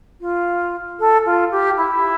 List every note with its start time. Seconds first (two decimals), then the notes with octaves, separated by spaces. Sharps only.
0.21 F4
0.99 A4
1.26 F4
1.51 G4
1.77 E4